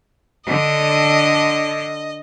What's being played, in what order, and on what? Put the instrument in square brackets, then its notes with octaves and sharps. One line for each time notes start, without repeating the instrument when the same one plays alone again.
[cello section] D3 [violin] D#5